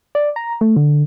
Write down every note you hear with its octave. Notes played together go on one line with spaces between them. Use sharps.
D5
A#5
A3
D3